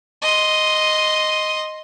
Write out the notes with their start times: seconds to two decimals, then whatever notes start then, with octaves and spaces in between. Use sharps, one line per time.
0.22 D#5 C6